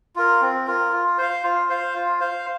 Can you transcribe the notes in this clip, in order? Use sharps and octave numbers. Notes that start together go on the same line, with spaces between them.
F4 A#4
C4
F4 A#4
F4
C5 F5
F4
C5 F5
F4
C5 F5